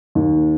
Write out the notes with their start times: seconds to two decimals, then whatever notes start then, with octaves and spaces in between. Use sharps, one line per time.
0.15 D#2